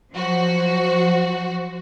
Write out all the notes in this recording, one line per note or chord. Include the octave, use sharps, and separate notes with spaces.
F3 F#3 F#4 C5